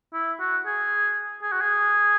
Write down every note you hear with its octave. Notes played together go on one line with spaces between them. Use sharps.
E4
F#4
G#4
G#4
F#4
G#4